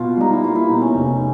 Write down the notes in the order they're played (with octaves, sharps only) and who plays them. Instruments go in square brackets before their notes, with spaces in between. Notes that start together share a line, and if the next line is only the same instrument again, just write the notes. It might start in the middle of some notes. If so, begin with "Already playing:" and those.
Already playing: [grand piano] B2 [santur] F4
[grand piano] G3 [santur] D#4
[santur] E4
[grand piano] A#3 [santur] F4
[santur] E4
[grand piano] B2 [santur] D#4
[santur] C#4
[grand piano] F1